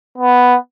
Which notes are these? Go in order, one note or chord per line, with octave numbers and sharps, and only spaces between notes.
B3